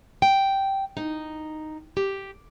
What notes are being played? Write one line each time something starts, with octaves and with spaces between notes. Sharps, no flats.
G5
D#4
G4